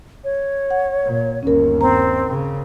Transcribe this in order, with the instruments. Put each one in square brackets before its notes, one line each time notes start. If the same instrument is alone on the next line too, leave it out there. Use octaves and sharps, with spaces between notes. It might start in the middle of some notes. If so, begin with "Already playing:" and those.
[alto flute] C#5
[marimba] F#5
[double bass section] A#2
[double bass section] G1 D#2 [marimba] C#4 A#4
[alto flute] C4 [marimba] A#5
[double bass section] C#3